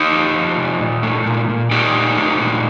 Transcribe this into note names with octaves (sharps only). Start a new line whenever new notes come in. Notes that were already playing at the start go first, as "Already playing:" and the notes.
Already playing: D#4 G4
F3
F3
C3
A#2
A3
A#2
A#2
A#2 D#4 G4
A3
A3
A#2